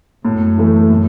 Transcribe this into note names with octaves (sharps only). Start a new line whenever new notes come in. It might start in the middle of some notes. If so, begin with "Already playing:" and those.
F#2 A2
E3 A3
A2